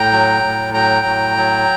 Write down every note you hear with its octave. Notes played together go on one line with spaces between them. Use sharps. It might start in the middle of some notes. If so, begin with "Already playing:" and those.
Already playing: A2 G5 A#5
F#3
A2
F#3 G5 A#5
A2
F#3